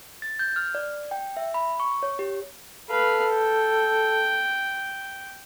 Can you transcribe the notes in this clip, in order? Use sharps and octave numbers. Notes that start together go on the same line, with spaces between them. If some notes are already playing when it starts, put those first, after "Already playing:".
A6
G6
F6
D5
G5
E5
B5
C#6
C#5
G4
A4 B4 F5
G5